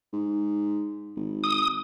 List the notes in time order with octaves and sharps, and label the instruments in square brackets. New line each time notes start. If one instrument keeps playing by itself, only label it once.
[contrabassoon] G#2
G#1
[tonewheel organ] D#6